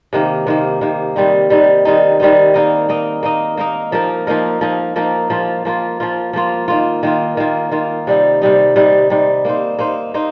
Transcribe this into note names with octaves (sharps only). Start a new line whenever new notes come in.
C3 D#3 A#3
C3 D#3 A#3
C3 D#3 A#3
D#3 G3 C4 D#4
D#3 G3 C4 D#4
D#3 G3 C4 D#4
D#3 G3 C4 D#4
A#3 D#4 A#4 D#5
A#3 D#4 A#4 D#5
A#3 D#4 A#4 D#5
A#3 D#4 A#4 D#5
F3 A#3 D#4 A#4
F3 A#3 D#4 A#4
F3 A#3 D#4 A#4
F3 A#3 D#4 A#4
F3 A#3 F4
F3 A#3 F4
F3 A#3 F4
F3 A#3 F4
D#3 A#3 F4
D#3 A#3 F4
D#3 A#3 F4
D#3 A#3 F4
C3 G3 D#4
C3 G3 D#4
C3 G3 D#4
C3 G3 D#4
A#3 D#4 C5
A#3 D#4 C5
A#3 D#4 C5